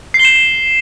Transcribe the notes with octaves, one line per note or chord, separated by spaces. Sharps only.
C7
G7
E7